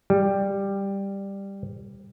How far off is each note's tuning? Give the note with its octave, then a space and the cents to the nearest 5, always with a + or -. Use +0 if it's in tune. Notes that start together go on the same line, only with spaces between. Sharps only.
G3 +10